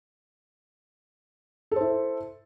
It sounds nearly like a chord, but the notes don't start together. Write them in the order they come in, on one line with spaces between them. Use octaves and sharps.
A4 C5 E4